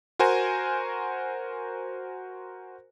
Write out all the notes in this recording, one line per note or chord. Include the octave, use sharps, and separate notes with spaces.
F#4 A#4 C5 G#5